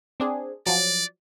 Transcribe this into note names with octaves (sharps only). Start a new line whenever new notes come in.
C4 D4 G#4
F3 F#3 D5